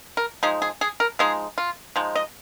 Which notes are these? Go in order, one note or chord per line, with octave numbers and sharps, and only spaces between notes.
A#4
F3 G#3 D#4 G#4
G#4
G#4
A#4
F3 G#3 D#4 G#4
F4
F3 G#3 D#4
D#5